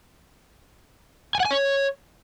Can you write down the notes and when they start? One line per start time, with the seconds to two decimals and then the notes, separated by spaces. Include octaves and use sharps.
1.35 G#5
1.40 F#5
1.45 G#5
1.51 C#5